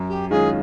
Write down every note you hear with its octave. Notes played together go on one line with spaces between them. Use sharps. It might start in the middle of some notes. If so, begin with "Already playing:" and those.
Already playing: F#2
G4
D#3 G#3 C#4 F4 G#4